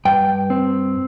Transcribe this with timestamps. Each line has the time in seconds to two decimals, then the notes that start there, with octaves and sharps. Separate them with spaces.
0.05 G2 G5
0.50 C4